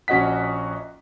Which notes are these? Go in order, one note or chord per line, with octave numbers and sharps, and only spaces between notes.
A#1 C#4 F#4 D#5 F#5 B6